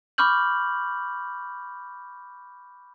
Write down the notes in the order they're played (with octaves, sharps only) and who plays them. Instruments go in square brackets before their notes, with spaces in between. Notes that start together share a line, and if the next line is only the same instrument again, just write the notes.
[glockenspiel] B5 C#6 D6 F6 G6 F#7